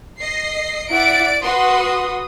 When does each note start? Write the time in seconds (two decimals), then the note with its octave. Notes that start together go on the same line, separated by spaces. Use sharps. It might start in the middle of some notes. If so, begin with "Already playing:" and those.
0.19 D#5 C7
0.90 E4 D5 F#5 D7
1.43 F#4 B4 C6 D#6